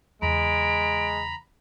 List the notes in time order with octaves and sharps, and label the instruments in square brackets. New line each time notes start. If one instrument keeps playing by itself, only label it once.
[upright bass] E2 C#3 [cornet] G#3 [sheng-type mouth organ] A#5 B5 [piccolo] D7